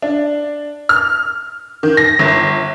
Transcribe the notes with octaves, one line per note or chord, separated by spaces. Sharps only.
D4
F6
D#3
A#6
G1